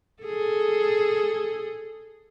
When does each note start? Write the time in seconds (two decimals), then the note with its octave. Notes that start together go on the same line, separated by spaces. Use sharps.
0.23 G#4 A4